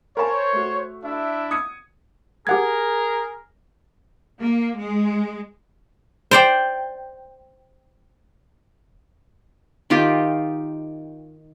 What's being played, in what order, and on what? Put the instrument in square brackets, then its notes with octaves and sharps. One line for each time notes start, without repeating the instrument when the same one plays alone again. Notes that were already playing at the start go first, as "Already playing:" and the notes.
[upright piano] A#4 G#5 A5 [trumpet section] C5 C#5
[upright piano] A3 F#4
[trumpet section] D4 E4 E5
[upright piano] D#6 G#6 C#7
[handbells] G4 F#5 G#6 [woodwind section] G#4 A#4
[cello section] A#3
G#3
[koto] C5 D5 G5
[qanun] D#3 D#4 F4 G4